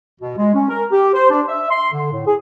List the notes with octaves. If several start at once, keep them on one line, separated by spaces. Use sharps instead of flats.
B2
G#3
C#4
A#4
G4
C5
D4
E5
C6
D3
A2
G#4